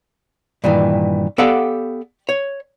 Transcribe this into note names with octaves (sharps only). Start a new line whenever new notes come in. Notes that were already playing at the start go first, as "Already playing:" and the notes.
G2 A#2 D#3 E3
B3 G4 A4 D5 F5 F#5
C#5